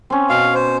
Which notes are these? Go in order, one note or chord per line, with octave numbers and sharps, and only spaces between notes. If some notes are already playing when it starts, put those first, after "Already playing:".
C4 C#4
B2 F5
C5